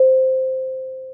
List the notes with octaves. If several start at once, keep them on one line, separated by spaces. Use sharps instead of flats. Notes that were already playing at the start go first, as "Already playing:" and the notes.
Already playing: C5